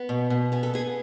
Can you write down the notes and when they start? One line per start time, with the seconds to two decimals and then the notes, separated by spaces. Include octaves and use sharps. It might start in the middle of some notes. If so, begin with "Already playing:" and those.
Already playing: B3
0.09 B2
0.30 B2
0.52 B3 G#4
0.63 A4
0.74 B3 G#4